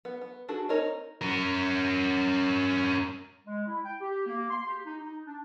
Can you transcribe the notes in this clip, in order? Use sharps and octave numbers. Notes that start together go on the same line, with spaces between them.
B3
B3
D4 F#4 G#4 A4
A#3 C4 D#4 A#4 C#5
C#4 A#4
G#3
E4
G5
G4
A#3
C6
G4
D#4
D#4
D4